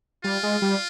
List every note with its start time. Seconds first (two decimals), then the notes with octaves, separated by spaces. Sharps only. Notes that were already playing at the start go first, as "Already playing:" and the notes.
0.24 G3 F4
0.43 G#3
0.62 G3